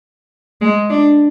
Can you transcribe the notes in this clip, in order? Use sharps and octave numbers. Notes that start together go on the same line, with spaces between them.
G#3
D4